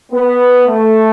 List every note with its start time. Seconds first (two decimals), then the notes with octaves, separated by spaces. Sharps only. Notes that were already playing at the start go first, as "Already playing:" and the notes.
0.12 B3
0.67 A3